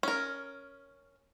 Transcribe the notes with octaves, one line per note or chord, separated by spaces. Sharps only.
C#4 A#4